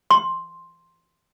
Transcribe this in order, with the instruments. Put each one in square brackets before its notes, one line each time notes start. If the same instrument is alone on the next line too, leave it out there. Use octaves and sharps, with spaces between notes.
[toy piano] C6